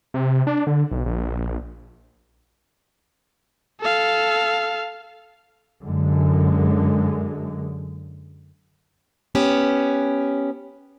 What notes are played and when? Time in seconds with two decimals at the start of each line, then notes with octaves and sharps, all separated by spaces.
0.14 C3
0.47 D4
0.67 D3
0.91 B1
1.06 A#1
3.80 A4 F5
5.86 F#2 D3 G#3
9.35 B3 C#4 G4